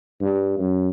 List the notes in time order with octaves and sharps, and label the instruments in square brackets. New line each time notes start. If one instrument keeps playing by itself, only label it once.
[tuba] G2
F#2